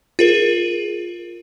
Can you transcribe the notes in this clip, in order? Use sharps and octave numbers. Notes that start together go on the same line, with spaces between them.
F4 G#4 A#4